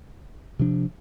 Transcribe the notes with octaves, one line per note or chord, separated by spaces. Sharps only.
C3 F3 D4